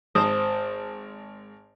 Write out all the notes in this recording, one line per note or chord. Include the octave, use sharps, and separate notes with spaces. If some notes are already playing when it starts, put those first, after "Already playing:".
G#1 C5 D#6